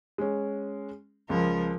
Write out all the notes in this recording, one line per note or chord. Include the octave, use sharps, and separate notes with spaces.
G#3 C#4
C#2 F3 A#4